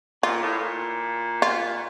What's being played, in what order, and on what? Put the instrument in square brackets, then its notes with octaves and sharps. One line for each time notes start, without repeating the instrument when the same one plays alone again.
[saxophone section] A#2 [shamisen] F4
[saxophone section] A2
A#2
[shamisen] F4